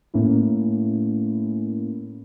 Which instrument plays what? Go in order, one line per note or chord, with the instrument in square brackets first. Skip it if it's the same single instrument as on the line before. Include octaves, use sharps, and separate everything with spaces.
[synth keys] A2 A3 A#3 C#4 E4